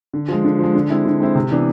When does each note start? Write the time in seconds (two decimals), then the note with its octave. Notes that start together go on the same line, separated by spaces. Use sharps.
0.13 D3
0.28 F3 G#3
0.44 D3
0.59 F3 G#3
0.75 D3
0.90 G#3 C4 E4
1.05 D3
1.20 G#3 C4 E4
1.35 C3
1.51 E3 B3 D4